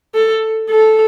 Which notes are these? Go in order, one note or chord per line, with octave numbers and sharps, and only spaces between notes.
A4
A4